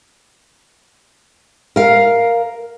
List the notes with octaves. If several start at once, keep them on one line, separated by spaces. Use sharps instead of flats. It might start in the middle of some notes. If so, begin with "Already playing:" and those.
A#4 F5